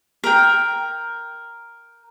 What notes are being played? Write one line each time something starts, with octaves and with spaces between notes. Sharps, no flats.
A#4 G5